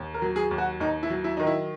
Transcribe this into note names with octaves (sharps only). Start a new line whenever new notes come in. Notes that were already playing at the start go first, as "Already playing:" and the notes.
Already playing: D#2
A#4
F#3
G#4
D#2
F#4
D#2 D#4
E4
F#3
E4
D#3 D#4
E4